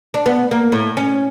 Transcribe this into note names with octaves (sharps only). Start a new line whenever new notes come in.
D4
B3
A#3
A2
C#4